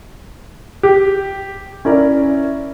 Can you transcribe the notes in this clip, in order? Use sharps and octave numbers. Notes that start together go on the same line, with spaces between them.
G4
C#4 E4 A#4 D5 E5